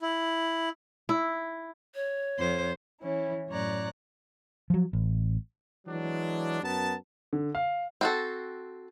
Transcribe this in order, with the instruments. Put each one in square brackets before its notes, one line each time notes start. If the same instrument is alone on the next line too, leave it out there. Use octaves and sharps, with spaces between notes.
[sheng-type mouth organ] E4
[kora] E4
[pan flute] C#5
[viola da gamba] F2 C5
[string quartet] E3 C#4 E4
F#2 A2 C#5 D5 A#5 F#6
[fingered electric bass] F3 F#3
A1
[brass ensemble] E3 F#3 G#3 D4
F#2 B3 A#4 A5
[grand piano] D3
F5
[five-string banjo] C4 F#4 A4